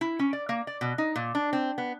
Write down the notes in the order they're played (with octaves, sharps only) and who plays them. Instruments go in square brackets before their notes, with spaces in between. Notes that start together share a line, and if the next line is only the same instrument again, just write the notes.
[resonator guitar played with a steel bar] E4
C#4
D5
A#3
D5
B2
D#4
A#2
D4
C4
B3